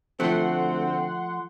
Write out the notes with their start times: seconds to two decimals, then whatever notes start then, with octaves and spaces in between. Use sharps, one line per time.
0.20 D2 F3 A3 C4 F#5 C6